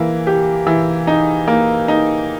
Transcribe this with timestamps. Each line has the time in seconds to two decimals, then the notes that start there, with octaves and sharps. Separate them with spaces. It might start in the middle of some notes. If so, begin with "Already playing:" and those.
Already playing: E3 A#3
0.27 G4
0.67 E3
1.07 D#4
1.48 A#3
1.88 D#4